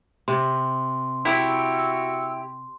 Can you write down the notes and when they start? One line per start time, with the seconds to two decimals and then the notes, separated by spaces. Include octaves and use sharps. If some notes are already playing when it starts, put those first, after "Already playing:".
0.28 C3 C6
1.25 E4 F#4 G4 B5 C#6 E6